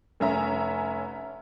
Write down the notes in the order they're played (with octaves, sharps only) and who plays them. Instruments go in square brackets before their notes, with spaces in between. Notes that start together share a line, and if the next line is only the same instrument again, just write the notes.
[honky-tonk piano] F1 C#4 E5 A#5